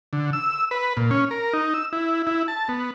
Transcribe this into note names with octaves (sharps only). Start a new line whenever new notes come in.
D3
E6
B4
A#2
C#4
A#4
D#4
E6
E4
E4
A5
B3